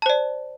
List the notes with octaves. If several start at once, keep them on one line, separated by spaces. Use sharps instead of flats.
C5 D5 A5